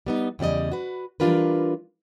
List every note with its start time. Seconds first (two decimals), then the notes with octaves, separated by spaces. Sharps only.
0.06 G3 B3 D#4
0.39 E2 C#3 G3 D5 D#5
0.71 F#4 B4
1.20 E3 G3 D4 F4 A#4 B4